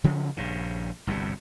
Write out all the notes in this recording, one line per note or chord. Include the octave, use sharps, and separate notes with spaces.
C#3 F3 F#3 C#4
A#1 G2 C#3
G1 C2 G2 B2